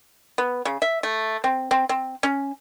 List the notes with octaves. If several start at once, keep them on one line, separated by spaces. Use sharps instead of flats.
B3
C#3
E5
A3
C4
C4
C4
C#4